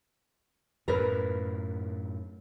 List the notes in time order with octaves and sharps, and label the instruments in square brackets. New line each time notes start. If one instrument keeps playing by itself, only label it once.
[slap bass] F#2 A2 [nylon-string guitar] A#4 B4